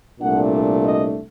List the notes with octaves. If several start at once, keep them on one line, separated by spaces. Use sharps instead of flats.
C2 A#2 A3 D4 F#5
D#5